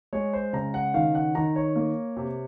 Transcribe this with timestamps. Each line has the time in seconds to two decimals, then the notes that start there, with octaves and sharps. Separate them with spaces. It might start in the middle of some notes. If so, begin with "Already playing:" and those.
0.13 G#3 C#5
0.33 C5
0.53 C#3 A#5
0.74 F#5
0.94 D#3 F5
1.15 F#5
1.35 D#3 A#5
1.56 C#5
1.76 A#3
2.17 C3